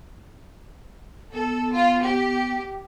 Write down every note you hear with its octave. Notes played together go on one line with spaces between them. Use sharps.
B3 A4
F4
G4